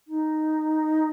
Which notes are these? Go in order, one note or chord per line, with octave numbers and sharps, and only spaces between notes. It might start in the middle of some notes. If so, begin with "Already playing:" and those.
D#4